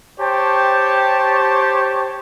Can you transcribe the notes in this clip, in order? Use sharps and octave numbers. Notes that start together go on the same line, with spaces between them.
G4 C5 C#5 G5 A5